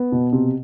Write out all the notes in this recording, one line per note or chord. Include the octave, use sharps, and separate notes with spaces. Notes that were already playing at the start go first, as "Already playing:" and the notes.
Already playing: B3
B2
C3